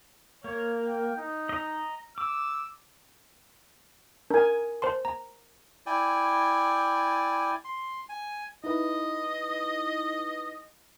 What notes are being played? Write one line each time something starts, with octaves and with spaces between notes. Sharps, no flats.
A#3 C#5
G5
D#4
D#5 A#5
D6 E6
D4 A#4 G#5
C5 A5 C6
A#5
E4 D5 G5 G#5
C6
G#5
D#4 E4 B4 D#5